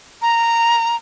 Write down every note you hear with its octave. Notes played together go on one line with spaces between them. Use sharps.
A#5